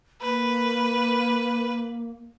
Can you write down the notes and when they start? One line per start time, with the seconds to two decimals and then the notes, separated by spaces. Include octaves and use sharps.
0.22 A#3 B4